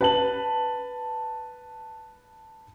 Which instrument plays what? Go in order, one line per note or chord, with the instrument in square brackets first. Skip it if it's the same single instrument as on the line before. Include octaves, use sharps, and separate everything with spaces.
[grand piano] B4 A5 F#7